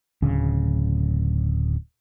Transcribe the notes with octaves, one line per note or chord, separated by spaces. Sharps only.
D1 C#3